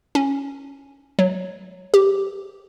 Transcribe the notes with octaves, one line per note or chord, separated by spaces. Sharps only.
C#4
F#3
G4